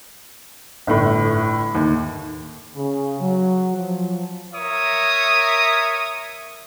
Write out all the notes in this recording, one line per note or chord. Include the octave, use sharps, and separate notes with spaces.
G1 A2
D#2
C#3
F#3
F3
A#4 C#5 E5 D#6